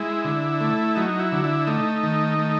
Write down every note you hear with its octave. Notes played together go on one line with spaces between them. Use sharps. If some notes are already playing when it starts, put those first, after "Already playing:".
Already playing: G#3 E4
D3
A3
F#3 D#4
E4
D3
E4
A3 D#4
D#3
A3